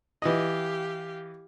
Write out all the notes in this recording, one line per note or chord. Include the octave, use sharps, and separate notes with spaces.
E3 G4 D#5 F5